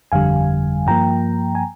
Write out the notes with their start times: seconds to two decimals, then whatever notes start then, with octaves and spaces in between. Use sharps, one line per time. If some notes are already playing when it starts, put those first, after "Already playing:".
0.12 G1 F2 D3 G3 F5 G#5
0.87 G2 F3 A#3 G5 A#5
1.55 G#5